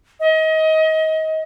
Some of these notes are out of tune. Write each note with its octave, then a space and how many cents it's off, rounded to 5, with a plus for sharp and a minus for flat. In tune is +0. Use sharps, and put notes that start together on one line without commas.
D#5 +30